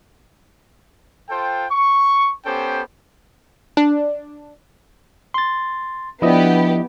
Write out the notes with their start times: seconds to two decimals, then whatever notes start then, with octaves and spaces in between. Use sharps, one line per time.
1.29 F4 A4 C5 G5
1.71 C#6
2.45 B3 C#4 G4 A4 C5 G5
3.77 D4
5.34 C6 A6
6.22 F3 B3 D4 E4 G4 D#5